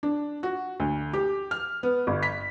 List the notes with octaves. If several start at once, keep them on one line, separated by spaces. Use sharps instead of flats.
D4
F#4
D2
G4
F6
B3
G1
B6